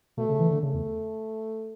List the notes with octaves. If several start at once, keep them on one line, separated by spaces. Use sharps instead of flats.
B2 A3
C#3
E3
D3
C#3 A3
E2